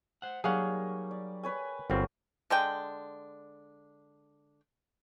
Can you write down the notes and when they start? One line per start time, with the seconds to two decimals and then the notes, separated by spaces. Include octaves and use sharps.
0.22 C5 F#5
0.44 F#3 G3 A#3 D#4 G#4 C#5 F5 F#5
1.11 D5
1.43 B4 C#5 G#5
1.90 G1 F#3 C4 A#4
2.50 D3 G#3 D4 G5